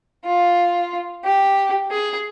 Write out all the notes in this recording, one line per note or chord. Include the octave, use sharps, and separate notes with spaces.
F4
G4
G#4